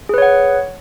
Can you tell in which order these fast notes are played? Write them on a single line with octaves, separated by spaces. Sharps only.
G#4 B4 C#5 F#5